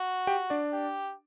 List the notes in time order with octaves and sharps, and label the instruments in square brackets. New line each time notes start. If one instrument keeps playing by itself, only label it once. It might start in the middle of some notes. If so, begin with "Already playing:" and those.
Already playing: [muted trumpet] F#4
[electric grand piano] G4 G5
D4 D5
[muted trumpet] G4